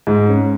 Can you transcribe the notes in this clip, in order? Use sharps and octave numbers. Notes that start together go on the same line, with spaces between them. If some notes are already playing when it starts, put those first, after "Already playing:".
G#2
C#4